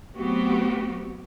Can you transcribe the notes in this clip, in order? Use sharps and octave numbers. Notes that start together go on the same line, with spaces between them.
F#3 A3 B3 C4 F#4 G4